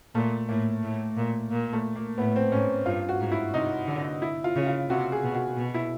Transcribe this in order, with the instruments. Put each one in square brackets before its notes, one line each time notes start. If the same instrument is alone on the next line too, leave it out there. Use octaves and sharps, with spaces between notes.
[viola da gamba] A#2 [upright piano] A3
[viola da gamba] A2 [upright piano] A#3
[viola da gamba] A2
A#2
A#2
[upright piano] A3
A#3
[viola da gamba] A2 [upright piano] B3
[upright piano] C4
[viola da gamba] G#2 [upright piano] C#4
[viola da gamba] G2 [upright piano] F4
[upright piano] F#4
[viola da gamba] G#2
[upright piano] E4
[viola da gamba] C3 [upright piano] D#4
[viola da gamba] D3
[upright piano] E4
F4
[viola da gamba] C#3
[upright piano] F4
[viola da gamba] C3 [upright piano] F#4
[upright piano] G#4
[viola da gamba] B2
[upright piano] F#4
[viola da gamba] B2
[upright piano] E4